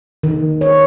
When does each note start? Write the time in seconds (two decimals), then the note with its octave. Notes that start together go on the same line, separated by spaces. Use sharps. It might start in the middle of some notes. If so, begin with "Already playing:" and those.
0.23 D#3
0.61 C#5